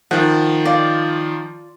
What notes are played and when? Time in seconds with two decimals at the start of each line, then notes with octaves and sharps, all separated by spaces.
0.11 D#3 F3 F#5
0.65 F4 D5